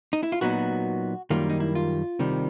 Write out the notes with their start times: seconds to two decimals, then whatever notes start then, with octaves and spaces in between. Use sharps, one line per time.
0.13 D#4
0.23 E4
0.32 F4
0.41 A#2 F#3 B3 D#4 F#4
1.30 F#2 D#3 G3 A#3 F4
1.49 D#4
1.60 E4
1.75 F4
2.19 C2 C3 D#3 G3